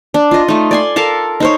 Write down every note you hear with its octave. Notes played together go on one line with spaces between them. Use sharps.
D4
F4 D#5
A3 D#4
D5 G#5 C6
A4 A#4 F5 A5
D#4 C5 C#5